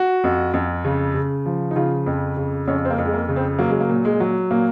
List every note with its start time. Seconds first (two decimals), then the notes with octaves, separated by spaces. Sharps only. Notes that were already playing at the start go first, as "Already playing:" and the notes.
Already playing: F#4
0.24 F2
0.54 F2
0.85 C#3
1.15 C#3
1.46 F3
1.71 D#4
1.76 C#3 F4
2.06 F2
2.37 C#3
2.67 F2 C#4
2.85 C4
2.90 A#3
2.98 F2
3.05 G#3
3.13 A#3
3.29 C#3
3.36 C4
3.59 F#3 A#3
3.69 G#3
3.81 A#3
3.89 A#2
4.05 G#3
4.20 F#3
4.51 A#2 A#3